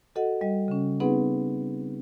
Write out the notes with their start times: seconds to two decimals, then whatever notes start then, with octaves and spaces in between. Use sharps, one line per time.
0.16 F#4 A4 D#5 F#5
0.41 G3 D#5
0.68 C#3 C#4
1.00 B3 C4 D#4 G#4 B4 F#5